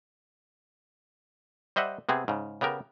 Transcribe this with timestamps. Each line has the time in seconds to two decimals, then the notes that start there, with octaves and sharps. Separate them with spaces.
1.76 G3 C5 D#5 E5 F#5
2.09 C3 B3 C4 G#4
2.28 G#2 C#3
2.61 C#3 B3 G4 A#4